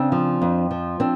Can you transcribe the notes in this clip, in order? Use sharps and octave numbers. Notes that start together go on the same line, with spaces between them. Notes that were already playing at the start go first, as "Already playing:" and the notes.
Already playing: C#3 C4 D4
F3
F2
F3
C4 D4